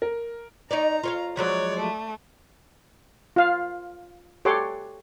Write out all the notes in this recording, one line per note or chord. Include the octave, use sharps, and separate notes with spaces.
A#4
D#4 C#5 D5 A#5
F4 C#5 F5
F3 F#3 G#3 C#5 D5
A3
F4 F5
G4 A4 C#5 F#5 C6 D6